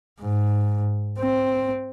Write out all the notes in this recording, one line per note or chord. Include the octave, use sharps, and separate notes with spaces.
G#2
C4